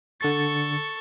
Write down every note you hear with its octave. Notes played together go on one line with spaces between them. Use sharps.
D3 A4 C#6 A6